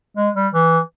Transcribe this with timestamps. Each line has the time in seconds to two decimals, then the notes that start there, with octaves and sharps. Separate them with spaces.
0.17 G#3
0.35 G3
0.53 E3